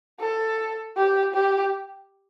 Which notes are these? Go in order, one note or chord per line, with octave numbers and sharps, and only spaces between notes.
A4
G4
G4